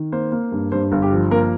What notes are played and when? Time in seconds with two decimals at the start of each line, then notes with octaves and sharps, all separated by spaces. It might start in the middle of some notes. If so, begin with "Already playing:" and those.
Already playing: D#3
0.12 A#3 C5
0.32 A#3
0.52 G2
0.72 G2 C5
0.92 G1
1.02 G4
1.12 F3
1.31 A#3 A#4